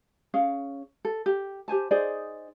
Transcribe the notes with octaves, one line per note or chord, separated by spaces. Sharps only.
C#4 G#4 F5
A4
G4
G4 C5 G#5 A5
D#4 G#4 C5 D5